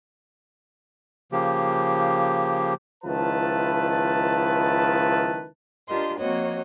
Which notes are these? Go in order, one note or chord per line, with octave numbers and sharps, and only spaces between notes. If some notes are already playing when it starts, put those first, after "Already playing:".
C#3 F3 A#3 G4
C#2 D#3 F3 E4 B4 A5
D4 F4 G4 A#4 D#5 C6
F3 A#3 C4 F#4 C#5 D#5